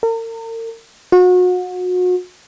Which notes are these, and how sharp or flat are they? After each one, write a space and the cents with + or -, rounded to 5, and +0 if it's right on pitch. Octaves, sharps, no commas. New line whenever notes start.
A#4 -40
F#4 -35